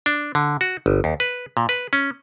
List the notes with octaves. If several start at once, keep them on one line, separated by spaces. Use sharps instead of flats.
D4
D3
F#4
G1
D#2
B4
A#2
B4
C#4